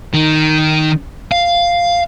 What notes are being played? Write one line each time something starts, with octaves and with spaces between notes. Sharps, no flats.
D#3
F5